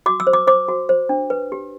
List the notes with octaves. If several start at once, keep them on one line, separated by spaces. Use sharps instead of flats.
F#4 D6
E6
C5
D6
C5 D6
F#4
C5
D4
B4
G4